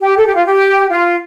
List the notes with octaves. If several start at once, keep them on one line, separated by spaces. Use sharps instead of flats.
G4
A4
G4
F4
G4
F4